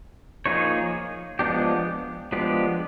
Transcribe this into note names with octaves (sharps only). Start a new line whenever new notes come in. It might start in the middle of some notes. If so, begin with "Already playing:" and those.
F3 A#3 D#4 G#4 C#5
F3 G#3 B3 D4 G4
F3 G#3 B3 D4 G4